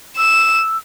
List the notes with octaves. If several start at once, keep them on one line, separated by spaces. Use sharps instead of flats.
E6 E7